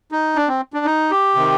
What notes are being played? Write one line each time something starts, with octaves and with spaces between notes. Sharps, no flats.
D#4
D4
C4
D4
D#4
G4
C3 D#3